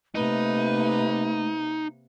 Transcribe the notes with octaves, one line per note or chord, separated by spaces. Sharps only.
C3 A3 A#3 D#4 B4